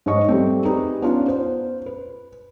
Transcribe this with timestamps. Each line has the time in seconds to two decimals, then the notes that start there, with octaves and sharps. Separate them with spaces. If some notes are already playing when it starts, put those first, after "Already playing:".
0.06 G#2 C5 C#5 D#5 C#6
0.28 G3 A3 C4
0.65 D#4 G4 G#4 B4
1.02 B3 C#4 D4 F4
1.28 C5
1.86 B4